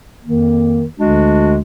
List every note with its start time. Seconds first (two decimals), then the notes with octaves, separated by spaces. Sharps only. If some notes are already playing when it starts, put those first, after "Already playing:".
0.25 F2 D#3 A#3
0.99 D2 D3 G#3 D4 F#4